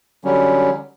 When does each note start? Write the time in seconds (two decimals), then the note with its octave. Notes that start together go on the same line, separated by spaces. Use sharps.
0.25 D3 F#3 G3 C#4